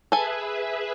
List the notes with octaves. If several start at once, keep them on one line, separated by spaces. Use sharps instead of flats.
G#4 A4 B4 E5 G#5